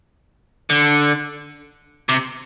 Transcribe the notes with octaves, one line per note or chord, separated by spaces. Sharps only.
D3
C3